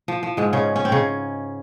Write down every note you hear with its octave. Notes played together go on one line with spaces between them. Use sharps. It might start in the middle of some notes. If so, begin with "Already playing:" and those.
F3
F3
G#2 G#3
C#3 C#4
C#4
C4
C#3 C#4